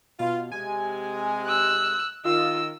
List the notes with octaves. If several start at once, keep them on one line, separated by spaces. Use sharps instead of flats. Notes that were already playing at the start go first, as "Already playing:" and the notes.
B2 F4
C3 G#3 G#5
E6 F#6
D#3 F4 D#5 E6